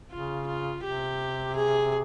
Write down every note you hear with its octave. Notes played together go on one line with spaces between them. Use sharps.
C#3 F4
F4
C3 G4
G#4